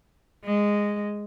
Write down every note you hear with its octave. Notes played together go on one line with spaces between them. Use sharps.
G#3